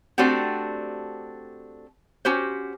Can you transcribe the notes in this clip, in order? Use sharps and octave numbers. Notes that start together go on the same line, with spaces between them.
A3 C4 D4 F#4 G4
C#4 F#4 G4 C5